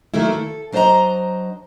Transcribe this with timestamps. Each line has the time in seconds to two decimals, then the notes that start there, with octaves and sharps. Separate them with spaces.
0.14 D#3 F#3 A3 A#3 E4
0.33 A4
0.72 F#3 D4 C5 C#5 D#5 A#5